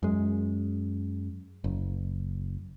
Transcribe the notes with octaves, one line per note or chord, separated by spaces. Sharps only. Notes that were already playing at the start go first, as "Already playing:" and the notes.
F#2 G#3
F#1